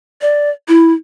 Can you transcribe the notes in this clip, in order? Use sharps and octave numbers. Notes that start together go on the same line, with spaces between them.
D5
E4